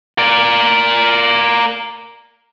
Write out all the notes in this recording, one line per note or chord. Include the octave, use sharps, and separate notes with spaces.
A#4 D5